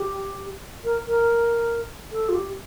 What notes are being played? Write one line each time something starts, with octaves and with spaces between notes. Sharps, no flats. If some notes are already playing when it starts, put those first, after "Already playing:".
Already playing: G4
A#4
A#4
A4
F4
G4